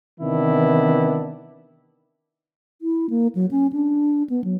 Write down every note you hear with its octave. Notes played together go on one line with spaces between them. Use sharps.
C3 D#3 E3 B3 D4 E4
E4
A#3
F#3
C#4
D4
B3
F#3